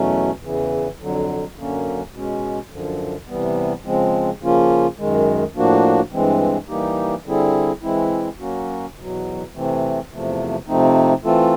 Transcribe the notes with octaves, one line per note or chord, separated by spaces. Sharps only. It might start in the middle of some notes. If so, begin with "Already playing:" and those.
Already playing: E2 B2 F#3 A3 C#4
E2 C#3 E3
F2 D3 F#3
F#2 D3 F#3 A#3 C#4
B2 G#3 C#4
F#2 D3 F3
C3 E3 G3 B3
C#3 F3 G#3 C4
C#3 F3 A#3 C#4 F4
F#2 D#3 G#3
A2 F3 A#3 D4 F#4
G2 E3 G#3 C4
E3 G3 A#3 D#4 G4
D3 G3 C4 E4 G#4
E3 G#3 C4 E4
F#3 A#3 C#4 F#4
E2 B2 F#3
C3 E3 A3 C4
E2 C3 F3 A3
C3 F3 A3 C4 D#4
E3 A3 C4 F4 A4